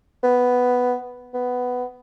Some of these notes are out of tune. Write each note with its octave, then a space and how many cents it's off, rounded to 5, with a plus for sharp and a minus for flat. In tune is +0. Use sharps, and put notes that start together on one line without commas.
B3 +5
B3 +10